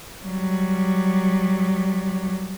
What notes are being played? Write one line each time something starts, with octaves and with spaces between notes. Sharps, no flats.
F#3 G3